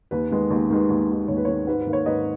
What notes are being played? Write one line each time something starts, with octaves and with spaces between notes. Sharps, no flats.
D#2 B4
D#3 G#3 B3
D#2
D#3 G#3 B3
D#2
D#3 G#3 B3
D#2 C#5
B4
D#3 G#3 B3 C#5
G#2 B4
B4
D#3 A#3
C#5
G#2 B4 D#5